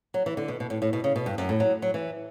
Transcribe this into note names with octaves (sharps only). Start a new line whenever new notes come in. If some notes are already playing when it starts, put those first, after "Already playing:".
F#3
E3
D3
B2
B2
A2
A2
B2
C#3
B2
G2
F#2
A2
F#3
F#3
E3